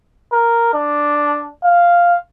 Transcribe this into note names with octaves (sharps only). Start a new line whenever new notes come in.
A#4
D4
F5